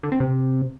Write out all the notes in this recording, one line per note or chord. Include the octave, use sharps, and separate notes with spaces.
D3
C4
C3